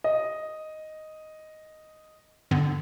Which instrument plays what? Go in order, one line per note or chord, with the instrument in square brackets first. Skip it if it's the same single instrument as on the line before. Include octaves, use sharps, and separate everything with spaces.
[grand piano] D#5
[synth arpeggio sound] G2 D3 B3